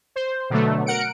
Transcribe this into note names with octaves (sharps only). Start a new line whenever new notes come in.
C5
B2 D3 F#3 A3
A#4 F#5 C#7 D7